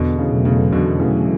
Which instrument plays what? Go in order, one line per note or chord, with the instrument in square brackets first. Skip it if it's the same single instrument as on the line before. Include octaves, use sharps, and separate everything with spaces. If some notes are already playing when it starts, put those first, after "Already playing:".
Already playing: [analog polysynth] E2 [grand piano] B2 D3
[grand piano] C#3
[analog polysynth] B2 F#3 A3
[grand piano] C#3
[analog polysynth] E2 [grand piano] B2 D3
[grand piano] C#3 E3
[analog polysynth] B2 F#3 A3